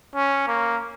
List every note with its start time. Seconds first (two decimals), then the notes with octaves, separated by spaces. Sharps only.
0.15 C#4
0.48 A#3